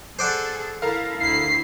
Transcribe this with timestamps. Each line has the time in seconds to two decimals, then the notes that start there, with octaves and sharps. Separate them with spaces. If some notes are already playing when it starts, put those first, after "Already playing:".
0.19 G#4 A4 C5 D5 F#5
0.82 E4 A4 A#4 F5
1.20 D2 E4 C7